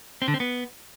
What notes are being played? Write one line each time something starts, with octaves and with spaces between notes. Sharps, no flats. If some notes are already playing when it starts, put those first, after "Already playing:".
C4
D3
C4
B3